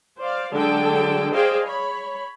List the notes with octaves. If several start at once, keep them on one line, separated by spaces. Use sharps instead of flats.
C5 D5 F5
D3 F#3 G#3 G#4 A4 G5
G#4 C5 D5 D#5 F5 G5
C#5 B5